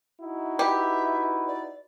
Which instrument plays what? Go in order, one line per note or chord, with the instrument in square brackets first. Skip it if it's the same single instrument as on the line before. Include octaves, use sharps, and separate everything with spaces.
[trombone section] D#4 E4 F#4
[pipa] G4 [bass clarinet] B4 [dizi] E5
[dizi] D5